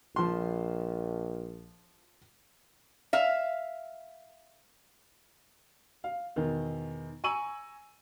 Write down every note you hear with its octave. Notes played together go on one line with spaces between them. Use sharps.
A#1 F3 C6
E5 F5
F5
E2 B2 D#3
G#5 A#5 C#6 E6 D#7 F#7